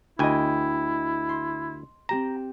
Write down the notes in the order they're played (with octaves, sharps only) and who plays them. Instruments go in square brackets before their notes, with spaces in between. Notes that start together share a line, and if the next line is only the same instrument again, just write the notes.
[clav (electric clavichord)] D2 G#5 [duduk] E4 [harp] D#5 G5
[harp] C6
[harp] C4 G4 E7 [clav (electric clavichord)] A#5